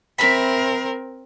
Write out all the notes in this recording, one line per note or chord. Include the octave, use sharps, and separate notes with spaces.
C4 A#4 E5 A#5 B5